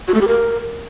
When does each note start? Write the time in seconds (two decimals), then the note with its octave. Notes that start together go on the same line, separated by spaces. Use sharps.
0.08 F#4
0.14 A3
0.21 G4
0.28 A#4